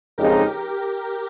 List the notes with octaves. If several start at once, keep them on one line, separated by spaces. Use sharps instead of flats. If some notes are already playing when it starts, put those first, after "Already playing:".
F2 C#3 G#3 D#4 G4 A#4